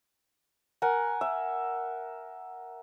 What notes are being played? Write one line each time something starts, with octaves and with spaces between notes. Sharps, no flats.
A#4 F#5 G#5
E5